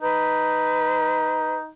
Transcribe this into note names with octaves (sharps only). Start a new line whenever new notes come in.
D#4 B4